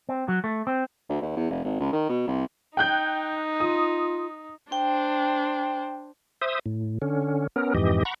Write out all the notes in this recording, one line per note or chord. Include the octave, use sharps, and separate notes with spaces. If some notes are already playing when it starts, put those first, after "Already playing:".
C4
F#3
A3
C4
D2
D#2
E2
F1
G#1
C#2
D#3
B2
C2
D#4 G5 F#6 G6
F4 D#6
D4 C5 G5
C5 E5 D#6
A2
D3 C#4
B3 C#4 A#4
F2 G#2 E3 G4 D#5
F#5 A#5 B5 C#6